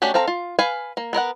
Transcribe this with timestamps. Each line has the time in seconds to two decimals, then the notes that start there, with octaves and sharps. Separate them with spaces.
0.02 A3 C#4 D4 F#4 G4
0.14 C4 A4 F5 A#5
0.28 F4
0.59 B4 F5 G#5
0.97 A#3
1.13 B3 A#4 D#5 F#5